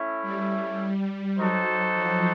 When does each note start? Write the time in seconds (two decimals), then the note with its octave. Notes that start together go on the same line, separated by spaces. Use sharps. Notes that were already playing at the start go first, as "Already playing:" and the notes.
Already playing: A3 C#4 E4
0.22 G3
1.37 F#3 D#4 F#4 A4 C5
1.94 F3